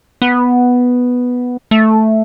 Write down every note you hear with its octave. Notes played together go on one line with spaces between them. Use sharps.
B3
A3